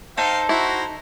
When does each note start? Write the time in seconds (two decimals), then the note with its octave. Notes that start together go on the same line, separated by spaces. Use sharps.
0.17 D#4 A4 C5 F5 G5
0.49 E4 F#4 C5 A#5